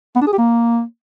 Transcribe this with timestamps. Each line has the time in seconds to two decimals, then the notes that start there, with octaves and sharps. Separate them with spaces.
0.16 B3
0.21 D4
0.27 G#4
0.33 G4
0.38 A#3